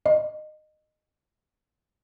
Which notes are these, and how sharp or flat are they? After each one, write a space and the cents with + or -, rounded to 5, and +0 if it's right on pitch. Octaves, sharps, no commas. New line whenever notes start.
D#5 -20